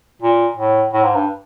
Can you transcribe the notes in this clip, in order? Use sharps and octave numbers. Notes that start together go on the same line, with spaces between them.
A#2
A2
A2
G#2
G2